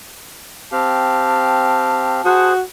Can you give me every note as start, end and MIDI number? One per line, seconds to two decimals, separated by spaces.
0.72 2.21 60
0.72 2.21 67
0.72 2.21 77
0.72 2.48 81
2.25 2.62 66
2.25 2.53 68
2.25 2.53 72
2.25 2.53 78